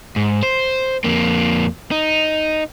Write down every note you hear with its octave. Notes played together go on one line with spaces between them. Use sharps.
G#2
C5
F2 A#3
D#4